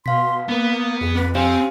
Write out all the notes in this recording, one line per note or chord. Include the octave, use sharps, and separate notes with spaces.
B2 F5 C6 B6
A#3 B3 B4
F2 G#4
C4 B4
C4 G4 C5 F5 G#5